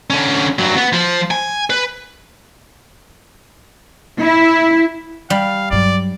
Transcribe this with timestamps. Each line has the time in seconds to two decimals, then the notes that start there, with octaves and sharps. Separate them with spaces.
0.10 D3 C#4
0.59 G2 F#3
0.76 B3
0.93 F3
1.31 G#5
1.70 B4
4.22 E4
5.30 G3 F5
5.71 G2 F#3 D5